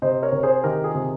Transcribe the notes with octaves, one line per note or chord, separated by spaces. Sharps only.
C3 C5 D#5
A#4 C#5
C3
C#5
G#4 C5
D#3 G4 A#4
F4 G#4
C3